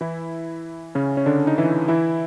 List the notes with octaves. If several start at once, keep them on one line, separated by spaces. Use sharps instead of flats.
E3 E4
C#3 C#4
C#4
D3 D4
D#4
E3 E4
E3 E4